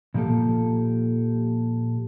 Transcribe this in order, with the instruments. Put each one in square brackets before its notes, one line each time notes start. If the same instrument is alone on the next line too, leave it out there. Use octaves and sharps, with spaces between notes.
[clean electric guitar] A#2 F3 A#3 G4 A4